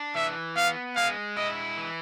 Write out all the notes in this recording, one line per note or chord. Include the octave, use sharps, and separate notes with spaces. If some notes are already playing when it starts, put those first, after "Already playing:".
Already playing: D4
E3 E5
B3 F5
G#3 F5
E4 D#5
E3